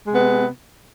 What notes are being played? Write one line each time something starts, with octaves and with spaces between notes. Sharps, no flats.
C3 G#3 B3